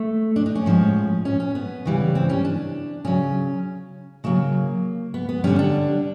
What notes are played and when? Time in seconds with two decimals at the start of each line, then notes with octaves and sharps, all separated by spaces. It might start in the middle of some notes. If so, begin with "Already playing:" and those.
Already playing: A3
0.36 D4
0.46 D#4
0.55 C#4
0.66 A2 F3 G#3
1.25 C#4
1.40 C#4
1.55 B3
1.85 C#3 E3 G3
2.15 C4
2.29 C#4
2.45 D4
3.05 C#3 F#3 C#4
4.24 C#3 F#3 A#3
5.14 B3
5.29 B3
5.44 D3 G3 C#4
5.59 D4